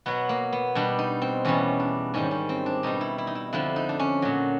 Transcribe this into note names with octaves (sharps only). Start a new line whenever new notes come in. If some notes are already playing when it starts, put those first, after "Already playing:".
B2 F#3 B3
A#3
B3
B2 G3 D4
D#4
C4
E2 B2 G3 C#4
D4
G#2 D#3 G3 C#4
C#4
C4
D4
B2 G3 D#4
E4
E4
D#4
E4
F2 D3 F3 E4
D#4
D4
C#4
A#2 F#3